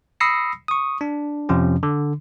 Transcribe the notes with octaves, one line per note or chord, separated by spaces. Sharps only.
B5 D#6 E6 A#6 C7 C#7
C#6 D#6
D4
F2 C3 F3 C#4
D3